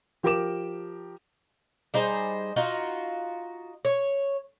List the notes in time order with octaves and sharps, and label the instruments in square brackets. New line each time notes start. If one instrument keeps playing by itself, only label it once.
[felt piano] F3 G4 A#4 D6 E7
[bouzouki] G3 D#4 G#4 C5
D#4 F4 F#4
C#5